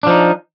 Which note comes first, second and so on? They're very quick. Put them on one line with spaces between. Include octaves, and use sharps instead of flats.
D4 F3 D#4